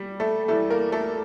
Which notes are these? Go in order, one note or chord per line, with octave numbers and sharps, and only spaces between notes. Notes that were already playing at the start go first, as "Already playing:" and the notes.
Already playing: G3 G4
A3 A4
E2 E3 G3 A3 A4
A#3 A#4
A3 A4